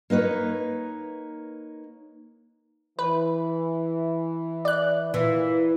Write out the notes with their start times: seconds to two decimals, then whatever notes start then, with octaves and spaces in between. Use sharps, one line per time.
0.10 A#3 D#4 B4 C#5
2.99 E3 B4
4.65 D5 F#6
5.14 A#2 E3